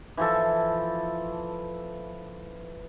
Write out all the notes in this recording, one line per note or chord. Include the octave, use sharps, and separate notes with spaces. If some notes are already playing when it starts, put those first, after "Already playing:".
E3 F3 A4